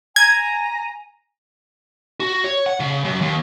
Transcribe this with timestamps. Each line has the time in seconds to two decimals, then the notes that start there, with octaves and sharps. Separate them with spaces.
0.16 G#5 A#5 G#6
2.20 F#4
2.44 C#5
2.66 F#5
2.80 C#3
3.04 F#2
3.21 D#2